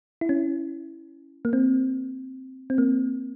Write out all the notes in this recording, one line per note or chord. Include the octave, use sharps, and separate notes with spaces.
E4
C#4
A#3
C4
C4
A#3